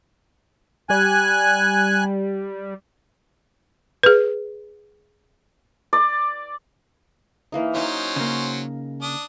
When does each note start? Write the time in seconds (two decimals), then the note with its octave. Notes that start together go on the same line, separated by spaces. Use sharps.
0.90 G3 G#5 F#6
4.03 G#4 B4
5.93 D5
7.52 E3 A#3 D#4
7.75 F#3 C#4 D#4 C5 C#5
8.16 C#3 A#3
9.02 D4 D#6